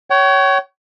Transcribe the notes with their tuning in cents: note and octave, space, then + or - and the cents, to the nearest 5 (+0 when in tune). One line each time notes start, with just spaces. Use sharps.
C#5 +10 G5 -45